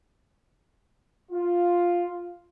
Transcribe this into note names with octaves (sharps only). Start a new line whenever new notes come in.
F4